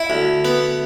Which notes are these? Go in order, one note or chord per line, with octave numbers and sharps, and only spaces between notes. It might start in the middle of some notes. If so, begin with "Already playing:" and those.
Already playing: E4
D2
B3